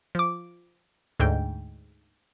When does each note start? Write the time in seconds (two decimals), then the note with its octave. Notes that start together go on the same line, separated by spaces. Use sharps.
0.15 F3 D6
1.20 D2 G#2 G5